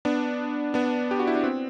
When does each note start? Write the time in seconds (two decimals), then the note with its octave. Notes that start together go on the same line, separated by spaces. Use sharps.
0.05 B3 D4
0.74 B3 D4
1.11 G4
1.19 F#4
1.27 E4
1.35 D4
1.44 C4